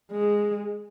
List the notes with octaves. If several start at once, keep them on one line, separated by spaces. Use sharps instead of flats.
G#3